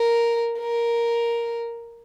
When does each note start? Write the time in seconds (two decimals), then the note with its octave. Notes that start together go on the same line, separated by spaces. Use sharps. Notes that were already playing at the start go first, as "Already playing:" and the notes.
Already playing: A#4
0.60 A#4